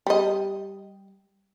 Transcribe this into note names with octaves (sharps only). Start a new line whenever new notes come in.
G3 D#5